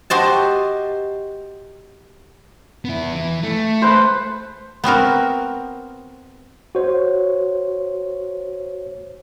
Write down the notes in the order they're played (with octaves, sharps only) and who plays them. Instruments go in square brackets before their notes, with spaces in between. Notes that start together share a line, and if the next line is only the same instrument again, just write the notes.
[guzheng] F#4 G4 C5 D#5 A5
[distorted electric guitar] B3 E4
E3
A3
[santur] B4 C5
[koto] B3 C4 F#4 A#4
[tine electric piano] F#4 C5 C#5